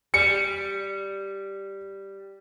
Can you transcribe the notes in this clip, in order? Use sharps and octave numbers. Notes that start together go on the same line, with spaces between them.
G3 C#7